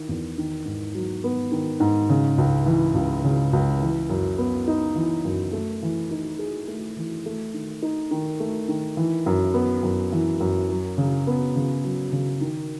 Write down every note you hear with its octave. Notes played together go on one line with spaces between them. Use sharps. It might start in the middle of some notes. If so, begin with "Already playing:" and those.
Already playing: D#3 E4
E2
D#3
G#2
F#3
B3
D#3
G#2
C#3
C#2
E3
C#2
C#3
C#2
E3
F#2
B3
D#4
E3
F#2
A3
E3
D#4
G#4
A3
E3
A3
D#3
D#4
D#3
A3
D#3
E3
F#2
B3
F#2
E3
F#2
F#3
C#3
B3
C#3
F#3
C#3
D#3